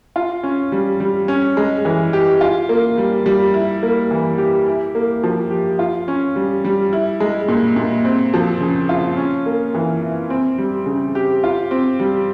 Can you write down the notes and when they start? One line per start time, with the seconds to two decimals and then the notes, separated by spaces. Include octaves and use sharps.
0.16 F4
0.43 C#4
0.72 G3
1.00 G3
1.28 C#4
1.57 G#3
1.85 E3
2.13 G4
2.41 F4
2.69 A#3
2.98 G3
3.26 G3
3.54 E4
3.83 A#3
4.11 E3
4.38 G4
4.66 E4
4.95 A#3
5.24 F3
5.51 G4
5.79 F4
6.08 C#4
6.36 G3
6.65 G3
6.93 E4
7.20 G#3
7.48 A#2
7.76 A#2
8.05 C4
8.34 F3
8.61 C#3
8.89 F4
9.17 C#4
9.46 A#3
9.75 E3
10.01 E4
10.30 C4
10.58 G3
10.86 C#3
11.15 G4
11.44 F4
11.71 C4
11.99 G3